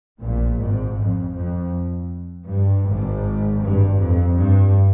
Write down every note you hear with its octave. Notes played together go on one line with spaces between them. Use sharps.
A#1 A#2
G#1 G#2
F2
F2
G2
G#1 G#2
G2
F2
G2